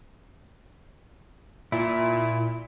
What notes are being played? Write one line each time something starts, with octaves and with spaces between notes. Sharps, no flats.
A#2 E4